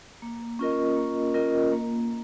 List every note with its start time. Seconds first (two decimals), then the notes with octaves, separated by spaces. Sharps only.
0.22 A#3
0.59 C#4 F4 A#4 D#5
0.97 A#3
1.34 C#4 F4 A#4 D#5
1.72 A#3